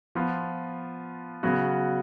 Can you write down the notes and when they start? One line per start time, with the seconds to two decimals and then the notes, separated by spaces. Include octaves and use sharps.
0.15 F3 B3 F4
1.43 C#3 F#3 B3 F#4